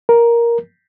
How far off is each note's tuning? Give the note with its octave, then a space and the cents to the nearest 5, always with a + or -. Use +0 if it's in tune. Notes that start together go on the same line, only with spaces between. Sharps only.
A#4 +10